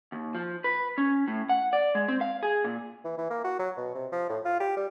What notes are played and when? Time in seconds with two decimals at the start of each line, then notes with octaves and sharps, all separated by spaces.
0.12 D#2
0.35 F3
0.64 B4
0.98 C#4
1.28 A2
1.49 F#5
1.73 D5
1.95 G#3
2.08 C4
2.21 F5
2.43 G#4
2.64 A#2
3.04 E3
3.18 E3
3.30 A#3
3.44 F#4
3.59 F#3
3.77 B2
3.95 C3
4.12 F3
4.29 A2
4.45 F4
4.60 G4
4.77 G3